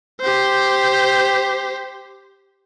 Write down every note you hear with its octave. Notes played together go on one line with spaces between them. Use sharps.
G4 C5